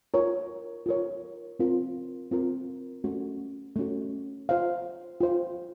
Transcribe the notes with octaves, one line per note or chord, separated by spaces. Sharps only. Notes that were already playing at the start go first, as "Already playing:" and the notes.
F4 A#4 C#5
F4 A#4 C#5
C4 F4 A#4
C4 F4 A#4
A3 C#4 F#4
A3 C#4 F#4
F4 C5 F5
F4 C5 F5